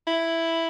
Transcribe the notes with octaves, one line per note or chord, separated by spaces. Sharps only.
E4